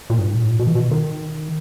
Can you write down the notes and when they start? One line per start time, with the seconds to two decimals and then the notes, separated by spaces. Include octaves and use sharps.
0.10 A#2
0.18 G2
0.27 G#2
0.35 A#2
0.42 A2
0.51 A#2
0.59 B2
0.67 E3
0.75 B2
0.91 D#3